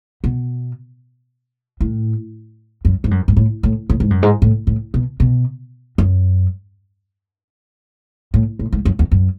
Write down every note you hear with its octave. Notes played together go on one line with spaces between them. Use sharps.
B2
A2
F#2
G#2
F#2
G#2
A2
A2
A2
G#2
F#2
G#2
A2
A2
B2
B2
F#2
A2
A2
G#2
F#2
E2
F#2